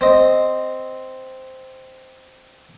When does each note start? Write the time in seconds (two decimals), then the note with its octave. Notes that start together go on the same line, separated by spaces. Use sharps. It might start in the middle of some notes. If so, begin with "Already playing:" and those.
0.01 C4 D#5